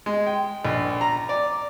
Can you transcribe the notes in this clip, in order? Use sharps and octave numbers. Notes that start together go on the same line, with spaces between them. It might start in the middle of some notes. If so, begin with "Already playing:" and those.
G#3
G5
A#1
A#5
D5